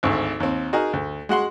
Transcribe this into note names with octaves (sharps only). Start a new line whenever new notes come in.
G#1 D2
D#2 C4
D#4 F#4 G#4 A#4
D2
G#3 F#4 F#5 C6